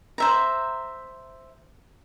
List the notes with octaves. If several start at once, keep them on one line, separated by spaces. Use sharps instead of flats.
C5 E5 A#5